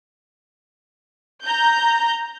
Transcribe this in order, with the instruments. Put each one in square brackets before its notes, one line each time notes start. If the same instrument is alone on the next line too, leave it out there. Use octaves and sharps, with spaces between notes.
[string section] A#5 G6